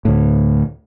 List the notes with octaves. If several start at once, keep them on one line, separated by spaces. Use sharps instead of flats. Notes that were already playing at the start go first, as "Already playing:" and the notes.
D2 A2